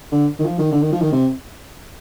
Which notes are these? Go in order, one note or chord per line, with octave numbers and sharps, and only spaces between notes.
D3
D#3
F3
D#3
D3
D#3
F3
D#3
C3